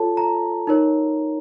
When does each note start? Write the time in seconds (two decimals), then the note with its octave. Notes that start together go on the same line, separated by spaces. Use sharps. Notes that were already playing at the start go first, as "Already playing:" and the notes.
Already playing: F4 A4 C#5 A5
0.17 A#5
0.67 D#4 A#4 C#5